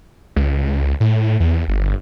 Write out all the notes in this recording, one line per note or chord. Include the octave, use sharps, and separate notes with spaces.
C#2
A2
E2
G1